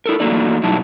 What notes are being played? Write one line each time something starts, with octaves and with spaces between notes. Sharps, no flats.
E4 A4 A#4
E2 F#3 A3 A#3 D#4 D5
G2 B2 F#3 D#4 E4 A5